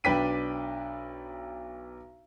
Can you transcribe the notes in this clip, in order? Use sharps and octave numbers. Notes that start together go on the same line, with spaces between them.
B1 D4 B4 G5 B6 D#7